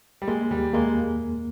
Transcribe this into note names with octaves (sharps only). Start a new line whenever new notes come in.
G3
G#3 A#3
D#2 G3
G#3 A#3